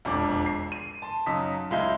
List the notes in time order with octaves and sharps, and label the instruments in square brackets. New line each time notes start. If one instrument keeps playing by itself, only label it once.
[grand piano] E1 A#1 F2 D4 D6
C7
D#7
A5 C6
F#2 C#3 D#4 D#6 E6 B6
C#2 G#3 E4 F5 G6